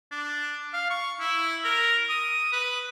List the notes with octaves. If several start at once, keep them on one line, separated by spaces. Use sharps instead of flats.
D4
F5
C#6
E4
A#4
D#6
B4